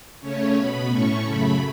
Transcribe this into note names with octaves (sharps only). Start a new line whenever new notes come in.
C#3 A3 C#4 C#5
B2 B3 B5
A2 A3 C#4 C#6
F#2 C#3 A3 B5